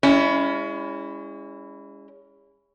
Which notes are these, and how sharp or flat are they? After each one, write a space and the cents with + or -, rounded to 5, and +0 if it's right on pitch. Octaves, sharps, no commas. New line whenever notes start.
G#3 -35 C#4 +25 E4 +0